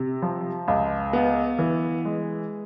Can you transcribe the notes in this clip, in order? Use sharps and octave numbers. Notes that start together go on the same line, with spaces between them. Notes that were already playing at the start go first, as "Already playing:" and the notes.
Already playing: C3
F3
C#2
B3
E3
G#3